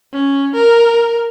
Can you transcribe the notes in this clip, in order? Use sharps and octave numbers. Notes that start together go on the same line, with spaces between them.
C#4
A#4